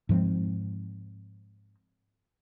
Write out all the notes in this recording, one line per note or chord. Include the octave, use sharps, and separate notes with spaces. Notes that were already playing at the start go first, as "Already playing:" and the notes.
G#2 F3 G#3 C4